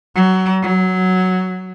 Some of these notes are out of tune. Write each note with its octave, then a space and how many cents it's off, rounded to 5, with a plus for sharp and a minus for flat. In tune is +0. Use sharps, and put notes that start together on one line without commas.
F#3 +20
F#3 +5